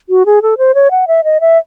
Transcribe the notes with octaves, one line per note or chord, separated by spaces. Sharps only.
F#4
G#4
A4
C5
C#5
F#5
E5
D#5
E5